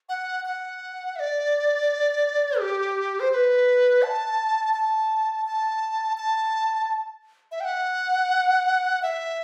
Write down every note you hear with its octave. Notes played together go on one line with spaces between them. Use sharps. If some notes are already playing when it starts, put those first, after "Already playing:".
F#5
F#5
E5
D5
G4
C5
C5
B4
A5
A5
A5
A5
E5
G5
F#5
E5